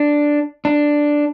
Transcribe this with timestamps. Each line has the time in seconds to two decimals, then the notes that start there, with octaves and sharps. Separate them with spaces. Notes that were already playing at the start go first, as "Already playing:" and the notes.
Already playing: D4
0.65 D4